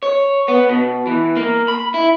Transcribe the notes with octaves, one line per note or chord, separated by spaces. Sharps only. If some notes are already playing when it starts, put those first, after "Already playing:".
C#5
B3
B2
E3
A#3
B5
E4